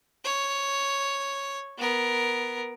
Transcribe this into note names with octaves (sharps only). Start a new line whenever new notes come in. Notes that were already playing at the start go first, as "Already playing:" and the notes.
C#5
B3 A#4